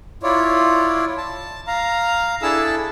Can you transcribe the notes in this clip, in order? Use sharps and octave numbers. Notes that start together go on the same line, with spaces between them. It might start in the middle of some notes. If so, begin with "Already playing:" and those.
E4 F4 C#5 D5
A5
F5 A#5
D4 E4 G#4 A4 A5 E6